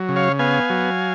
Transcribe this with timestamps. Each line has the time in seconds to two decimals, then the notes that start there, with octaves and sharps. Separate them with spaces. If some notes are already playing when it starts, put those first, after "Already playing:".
Already playing: F#3
0.09 C#3
0.16 C#5 F5
0.39 B3 F5 G#5
0.70 F#3